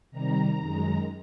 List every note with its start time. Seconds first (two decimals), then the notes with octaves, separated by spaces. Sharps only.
0.11 C3 D#3 G3 A#5
0.58 F#2 D#3 G#3